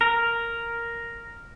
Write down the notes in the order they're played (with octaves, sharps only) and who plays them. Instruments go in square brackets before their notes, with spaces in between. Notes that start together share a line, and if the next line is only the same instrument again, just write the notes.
[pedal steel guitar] A#4